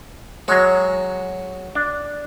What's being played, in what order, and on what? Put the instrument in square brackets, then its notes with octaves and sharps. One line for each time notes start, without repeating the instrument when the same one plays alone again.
[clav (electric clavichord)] F#3 G#3 [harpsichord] F#4 C#5
[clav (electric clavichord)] D4